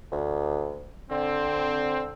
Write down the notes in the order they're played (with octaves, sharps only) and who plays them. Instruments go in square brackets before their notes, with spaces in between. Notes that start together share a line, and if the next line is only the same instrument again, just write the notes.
[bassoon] D2
[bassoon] D3 [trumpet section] C4